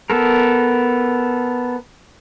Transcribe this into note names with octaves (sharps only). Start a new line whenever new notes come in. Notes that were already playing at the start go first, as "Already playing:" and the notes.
B3 A4 A#4